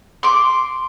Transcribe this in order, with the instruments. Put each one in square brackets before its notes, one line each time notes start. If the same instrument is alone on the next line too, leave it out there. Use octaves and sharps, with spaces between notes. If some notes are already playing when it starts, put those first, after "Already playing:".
[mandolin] C6 D6